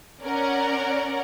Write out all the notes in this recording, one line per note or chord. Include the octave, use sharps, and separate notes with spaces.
C#4 A#4 D5 F#5